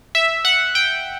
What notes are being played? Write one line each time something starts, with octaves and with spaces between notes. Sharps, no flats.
E5
F#5
G5